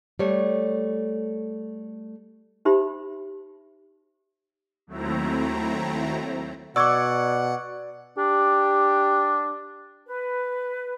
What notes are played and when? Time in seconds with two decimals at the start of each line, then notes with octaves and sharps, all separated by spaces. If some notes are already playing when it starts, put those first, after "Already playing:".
0.19 G3 A3 C#5
2.65 D#4 G4 C5 E5 B5
4.87 D#2 F#3 A3 C4 E4 A#5
6.76 B2 D5 F#5 C#6 D6 E6 G#6
8.18 D4 G4
10.07 B4